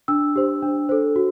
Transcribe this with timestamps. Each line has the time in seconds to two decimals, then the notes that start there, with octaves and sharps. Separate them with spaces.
0.08 D4 E6
0.36 G4 C5
0.62 D4
0.89 A4 C5
1.16 F#4